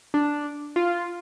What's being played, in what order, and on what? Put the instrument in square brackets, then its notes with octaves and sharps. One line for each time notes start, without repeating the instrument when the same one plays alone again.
[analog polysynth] D4
F4